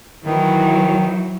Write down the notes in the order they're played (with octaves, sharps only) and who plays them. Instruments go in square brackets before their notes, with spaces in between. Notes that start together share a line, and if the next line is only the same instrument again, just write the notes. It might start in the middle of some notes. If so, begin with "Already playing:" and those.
[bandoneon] D#3 [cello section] E3 F#3